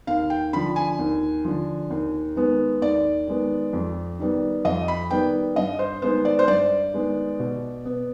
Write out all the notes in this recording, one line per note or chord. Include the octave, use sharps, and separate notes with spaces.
D#2 F5
G5
D3 F3 B5
G#5
D#2
D3 F3
D#2
D#3 G#3 B3
D#2 D5
D#3 G#3 B3
F2
D#3 G3 B3
F2 D#5
B5
D#3 G3 B3 G5
G2 D#5
C5
D#3 G#3 B3 C5
D5
C5
G2 D5
D#3 G#3 B3
B2
B3